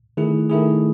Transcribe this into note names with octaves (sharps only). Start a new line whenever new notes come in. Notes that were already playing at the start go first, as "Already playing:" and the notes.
D#3 A3 E4 G#4
D#3 A3 E4 G#4